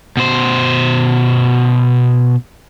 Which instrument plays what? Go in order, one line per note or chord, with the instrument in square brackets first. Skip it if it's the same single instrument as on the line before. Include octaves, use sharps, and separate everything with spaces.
[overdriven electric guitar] B2 C5